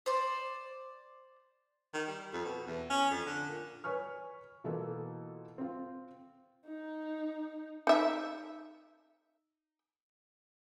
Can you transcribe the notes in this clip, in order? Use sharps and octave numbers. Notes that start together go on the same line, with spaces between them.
C5 D5
D#3
G3
F2
B2
E2
C#4
F2
D3
A#2
B4 C#5 G#5 C#6 F6
B2 E3 A#3 F4 A4
C4 F4
D#4
D#4 E5